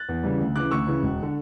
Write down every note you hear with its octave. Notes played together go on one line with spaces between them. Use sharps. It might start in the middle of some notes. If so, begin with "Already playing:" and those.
Already playing: F#6 A6
E2
C#3 E3 G3
D2
C#3 E3 D6 F#6
D2 C#6 E6
C#3 E3
E1
D3